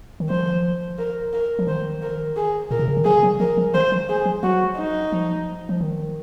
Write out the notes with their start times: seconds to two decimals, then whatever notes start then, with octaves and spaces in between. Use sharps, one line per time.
0.20 D#3
0.29 F3 C5
0.98 A#4
1.33 A#4
1.59 F3
1.67 D#3 C5
2.02 A#4
2.36 G#4
2.71 A#2 A#4
2.79 C3
2.88 C#3
2.97 D#3
3.05 F3 G#4
3.23 F#3
3.40 F3 A#4
3.57 F3
3.74 D#3 C5
3.92 F3
4.09 G#4
4.26 F3
4.43 F#3 F#4
4.78 D#4
5.12 F3
5.69 F3
5.81 D#3